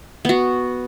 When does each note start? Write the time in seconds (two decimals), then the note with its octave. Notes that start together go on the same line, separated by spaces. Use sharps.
0.25 B3 F#4